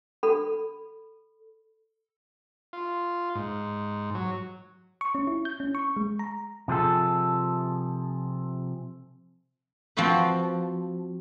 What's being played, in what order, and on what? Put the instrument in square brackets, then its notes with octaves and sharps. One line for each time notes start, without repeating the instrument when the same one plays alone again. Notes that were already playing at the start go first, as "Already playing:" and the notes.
[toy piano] A4 B5
[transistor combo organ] F4
G#2
F#3
[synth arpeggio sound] C#6
C#4
E4
G6
C#4
C#6
G#3
A#5
[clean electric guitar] C3 F3 G#4 A4
[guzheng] F3 C4 F4 F#4 B4